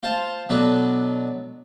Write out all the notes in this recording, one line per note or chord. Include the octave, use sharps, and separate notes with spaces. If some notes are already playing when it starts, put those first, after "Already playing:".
F4 C5 F5 A5
B2 F#3 D4 A4 B4